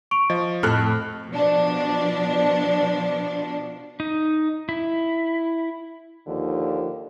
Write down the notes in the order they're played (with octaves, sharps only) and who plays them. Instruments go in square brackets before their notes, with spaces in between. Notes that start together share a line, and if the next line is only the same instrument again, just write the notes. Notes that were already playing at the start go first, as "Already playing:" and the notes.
[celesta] C#6 D7 F7
[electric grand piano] F3 [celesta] D#5
[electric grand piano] F2 F6 F#6 [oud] A2 A4
[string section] B2 F3 D4
[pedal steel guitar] D#4
E4
[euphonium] D#2 [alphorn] D3 [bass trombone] F3